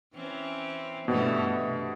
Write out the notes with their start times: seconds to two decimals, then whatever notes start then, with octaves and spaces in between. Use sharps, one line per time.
0.14 E3 C4 C#4
1.08 G2 B2 E3 A3
1.59 C3